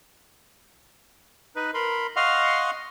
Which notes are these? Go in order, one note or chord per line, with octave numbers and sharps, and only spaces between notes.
D#4 B4
A#4 B5 C6
D#5 F5 F#5 C6 C#6 F6